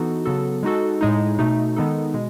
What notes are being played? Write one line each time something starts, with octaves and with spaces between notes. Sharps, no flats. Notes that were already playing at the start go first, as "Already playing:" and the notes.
Already playing: E3 B3 D#4 F#4 A4
C#3 F#3 B3 F#4 A4
G#3 D#4 F#4 A4
A2 G#3 D#4
B2 A3 D#4
D#3 G#3 B3 D#4 A4
B2 G#3